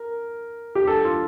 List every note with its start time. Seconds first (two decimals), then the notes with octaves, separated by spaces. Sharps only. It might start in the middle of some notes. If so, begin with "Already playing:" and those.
Already playing: A#4
0.75 G4
0.87 A4
1.04 F4